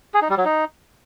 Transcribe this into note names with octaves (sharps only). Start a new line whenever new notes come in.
G#4
D#4
G3
F#3
D#4